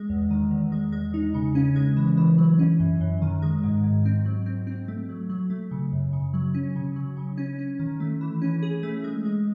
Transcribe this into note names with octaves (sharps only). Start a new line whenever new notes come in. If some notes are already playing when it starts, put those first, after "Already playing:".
Already playing: G#3
E2
D#3
E2
G#3
G#3
D#4
C#3
C#4
G#3
E3
E3
F#3
C#4
F#2
F#2
D#3
G#3
G#2
G#2
C4
F#3
C4
C4
A3
F#3
F#3
A3
C#3
F#2
C#3
F#3
C#4
C#3
F#3
C#3
C#4
C#4
D#3
A3
E3
C#4
G#4
A3
G#3
G#3